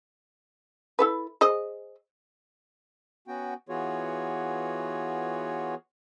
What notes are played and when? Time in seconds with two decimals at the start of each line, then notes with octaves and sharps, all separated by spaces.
0.99 E4 A4 B4
1.41 G#4 C5 D#5
3.28 B3 C#4 F#4 G5
3.69 E3 B3 F4 F#4 G#4 C#5